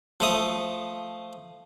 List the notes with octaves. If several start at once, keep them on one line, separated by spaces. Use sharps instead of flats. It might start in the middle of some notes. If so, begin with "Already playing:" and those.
F3 A3 D#6